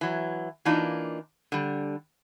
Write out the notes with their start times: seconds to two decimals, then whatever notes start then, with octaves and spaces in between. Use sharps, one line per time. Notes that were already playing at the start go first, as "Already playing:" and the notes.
0.01 E3 F#3
0.65 E3 A#3 D4 D#4 F4
1.52 D3 G3